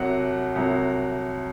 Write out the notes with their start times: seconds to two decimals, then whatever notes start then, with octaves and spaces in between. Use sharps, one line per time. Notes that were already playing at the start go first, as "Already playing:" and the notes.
Already playing: C2 C3 F#3 F#5
0.56 C2 C3 F#3